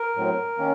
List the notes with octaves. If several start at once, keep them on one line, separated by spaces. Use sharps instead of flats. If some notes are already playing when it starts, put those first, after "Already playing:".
Already playing: A#4
A2 F#3 C4
D#3 A#3 C#4